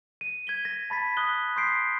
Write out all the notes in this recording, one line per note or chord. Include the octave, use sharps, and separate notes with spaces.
D#7
G#6 B6 G7
A#6
A5 B5 A6 B6
D#6 F#6 G7
C6 D#6 G6 B6 C7 D7